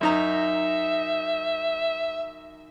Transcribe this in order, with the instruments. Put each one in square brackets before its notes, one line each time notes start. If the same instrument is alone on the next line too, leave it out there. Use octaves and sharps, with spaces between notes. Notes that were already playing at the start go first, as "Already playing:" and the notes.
[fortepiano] F#2 D#4 A#5 [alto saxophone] E5